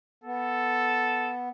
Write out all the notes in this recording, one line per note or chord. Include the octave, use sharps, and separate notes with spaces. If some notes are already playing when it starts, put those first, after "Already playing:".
B3 A4